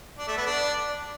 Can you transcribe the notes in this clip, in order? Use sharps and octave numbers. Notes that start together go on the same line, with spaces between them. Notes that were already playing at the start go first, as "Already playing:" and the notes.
D4
A3
B3
D4